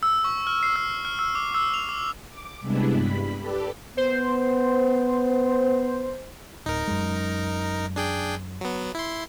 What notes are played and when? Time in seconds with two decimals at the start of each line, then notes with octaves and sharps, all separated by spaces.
0.03 E6
0.24 C#6
0.47 F6
0.63 C7
0.76 E6
1.05 F6
1.19 E6
1.35 D6
1.55 E6
1.74 F7
1.89 D6
2.28 D6
2.61 C3 G3 G#3 B3 D4 E4
2.90 G2 B5 B6
3.40 G4 A4 B4 D5
3.97 B3 C5
6.66 D1 D#4 A#4
6.88 F#2 G#3
7.96 D4 G#4 G5
8.61 F#3 B3
8.95 E4 C6